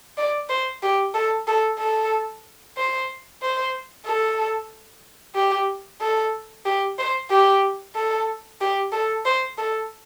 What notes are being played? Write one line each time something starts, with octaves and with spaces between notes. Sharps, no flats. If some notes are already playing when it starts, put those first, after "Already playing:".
D5
C5
G4
A4
A4
A4
C5
C5
A4
G4
A4
G4
C5
G4
A4
G4
A4
C5
A4